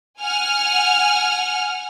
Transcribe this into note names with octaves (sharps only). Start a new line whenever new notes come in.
F#5 G#5 F6